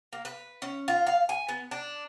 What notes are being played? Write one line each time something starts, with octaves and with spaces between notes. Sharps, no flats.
A#3
B4
C#4
F4
F5
G#5
B3
D4